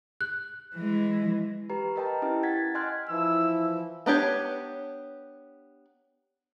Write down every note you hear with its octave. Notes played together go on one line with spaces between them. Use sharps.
F#6
E3 G#3
G4 B4 A#5
A#4 B4 D#5 G5 A5 A#5
C#4 E4 G4 G5
F#5 G#6 A6 B6
D#5 G#5 C6 F6 F#6 G#6
E3 F3 E4 E6
B3 D4 G4 C#5